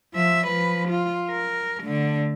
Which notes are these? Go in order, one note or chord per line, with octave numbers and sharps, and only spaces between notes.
F3 E5
F3 B4
F4
A#4
D3 A3